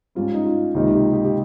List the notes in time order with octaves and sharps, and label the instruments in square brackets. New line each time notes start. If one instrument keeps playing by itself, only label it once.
[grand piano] G#2 G3 C#4 [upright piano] F4
[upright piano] D#4
F4
[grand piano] C#2 C3 D#3 A#3 D#4 [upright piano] G4
[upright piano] G4
G4
G4